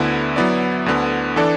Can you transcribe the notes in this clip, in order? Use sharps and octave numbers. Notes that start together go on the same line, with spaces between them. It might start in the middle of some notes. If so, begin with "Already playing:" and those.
Already playing: D2 D3 B3 E4
F#3 B3 E4 D5
D2 D3 B3
E3 D4 A4 D5